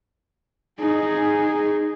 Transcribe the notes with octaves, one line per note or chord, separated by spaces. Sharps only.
D#4 G#4